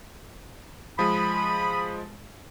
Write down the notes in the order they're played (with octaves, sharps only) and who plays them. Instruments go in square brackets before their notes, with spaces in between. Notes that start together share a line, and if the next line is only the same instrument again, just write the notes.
[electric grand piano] F3 G#3 [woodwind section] B5 D#6